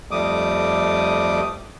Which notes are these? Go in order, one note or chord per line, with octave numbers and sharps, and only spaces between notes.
F2 G3 A3 D6 D#6